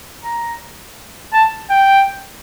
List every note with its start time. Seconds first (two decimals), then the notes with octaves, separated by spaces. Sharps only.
0.24 A#5
1.33 A5
1.70 G5